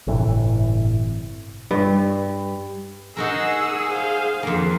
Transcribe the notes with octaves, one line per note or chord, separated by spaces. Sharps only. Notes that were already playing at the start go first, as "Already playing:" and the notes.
G1 A2 C3 E3
G2
D#4 F#4 G#4 A#4 F#5 E6
C5 F5
F2 A#3 D4